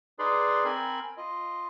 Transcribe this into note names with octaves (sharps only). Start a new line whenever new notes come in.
D#4 G#4 B4 D5 C6
C4 A#4 G#5 B5
F4 D#5